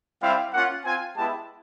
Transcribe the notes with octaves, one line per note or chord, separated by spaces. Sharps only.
G3 C4 E4 G4 F5
A#3 C#4 F4 F#5
C4 F4 G#5
G#3 B3 E4 G4 A5